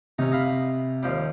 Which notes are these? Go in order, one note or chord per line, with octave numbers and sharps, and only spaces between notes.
C3 C#4 D#4
D#5 F5 B5
D#2 F3 G3